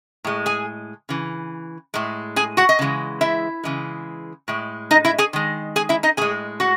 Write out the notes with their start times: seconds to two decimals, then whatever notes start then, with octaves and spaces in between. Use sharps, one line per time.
0.24 A2 G#3
0.46 G#4 G#5
1.09 C#3 E3
1.94 A2 G#3
2.36 G#4 G#5
2.57 F#4 F#5
2.69 D#5
2.79 C#3 E3 G#3
3.21 E4 E5
3.64 C#3 E3 G#3
4.48 A2 G#3
4.91 D#4 D#5
5.04 E4 E5
5.18 G#4 G#5
5.33 D#3 G#3
5.76 G#4 G#5
5.89 E4 E5
6.03 D#4 D#5
6.17 A2 G#3 G#4 G#5
6.60 F#4 F#5